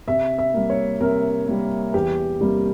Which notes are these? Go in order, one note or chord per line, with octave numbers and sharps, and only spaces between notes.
C3 E5
E5
G3 A#3
C#5
C3 A#4
G3 A#3
E2 G4
C3 G3 A#3